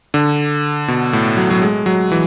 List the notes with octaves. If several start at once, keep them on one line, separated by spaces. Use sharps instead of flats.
D3
B2
A2
F#3
F#3
G#3
F#3
E3